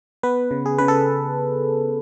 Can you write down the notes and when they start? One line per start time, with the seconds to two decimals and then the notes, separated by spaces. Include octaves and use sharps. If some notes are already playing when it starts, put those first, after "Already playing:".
0.23 B3 B4
0.51 C#3
0.66 G#4
0.78 C#3 B4
0.88 A4